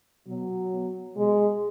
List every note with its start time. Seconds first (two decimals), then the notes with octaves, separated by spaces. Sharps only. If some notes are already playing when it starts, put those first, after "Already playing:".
0.27 B2 F#3
0.72 B2
1.16 B2 G#3